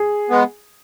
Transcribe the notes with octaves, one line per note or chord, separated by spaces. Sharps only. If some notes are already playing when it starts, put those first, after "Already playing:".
Already playing: G#4
G#3 B3